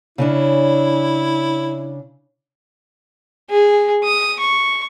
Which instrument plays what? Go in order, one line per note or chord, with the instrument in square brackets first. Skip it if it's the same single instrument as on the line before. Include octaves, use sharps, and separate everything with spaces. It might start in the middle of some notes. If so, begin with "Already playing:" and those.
[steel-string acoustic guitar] C#3 C#4 D4 [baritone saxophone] E4
[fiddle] G#4
D#6
C#6